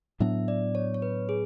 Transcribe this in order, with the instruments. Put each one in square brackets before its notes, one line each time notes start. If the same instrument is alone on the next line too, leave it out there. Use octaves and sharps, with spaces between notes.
[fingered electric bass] A2 F#3 B3 D4 [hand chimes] E5
[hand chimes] D5
C#5
C#5
B4
G#4